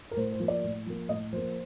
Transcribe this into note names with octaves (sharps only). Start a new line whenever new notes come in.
A#4
A2 C5
C5
F3 A#3
D5
A2
F3 A#3
A2 D#5
F3 A#3 C5